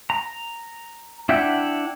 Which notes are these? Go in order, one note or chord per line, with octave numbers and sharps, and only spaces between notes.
A#5
D4 E4 E5 F#5 G5